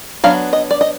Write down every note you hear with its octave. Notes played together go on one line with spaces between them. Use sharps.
F#3 B3 D4 F5
D#5
D5
D#5